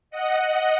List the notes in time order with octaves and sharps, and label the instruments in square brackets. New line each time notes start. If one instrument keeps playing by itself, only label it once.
[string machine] D#5 F#5